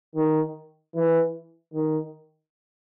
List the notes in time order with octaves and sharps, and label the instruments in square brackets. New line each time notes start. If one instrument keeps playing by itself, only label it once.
[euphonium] D#3
E3
D#3